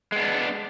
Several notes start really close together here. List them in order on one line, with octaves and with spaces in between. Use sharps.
G#3 B3 D4